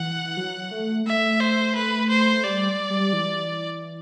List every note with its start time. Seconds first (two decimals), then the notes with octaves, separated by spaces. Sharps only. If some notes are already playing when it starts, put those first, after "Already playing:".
Already playing: E3 F#5
0.37 F#3
0.71 A3
1.06 A3 E5
1.40 C5
1.75 B4
2.10 C5
2.44 G3 D5
2.90 G3
3.13 E3